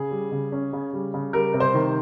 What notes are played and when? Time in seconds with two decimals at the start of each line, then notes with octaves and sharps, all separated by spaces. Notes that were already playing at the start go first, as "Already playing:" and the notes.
Already playing: C#3 G#4
0.11 G3
0.32 C#3
0.52 C#4
0.73 C#3
0.93 G3
1.14 C#3
1.33 G3 A#4
1.54 C3
1.60 C5
1.74 D#3